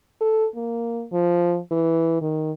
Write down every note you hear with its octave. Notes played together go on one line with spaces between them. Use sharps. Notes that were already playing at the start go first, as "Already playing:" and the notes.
A4
A#3
F3
E3
D#3